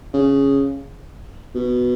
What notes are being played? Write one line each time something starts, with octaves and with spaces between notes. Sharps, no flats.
C#3
B2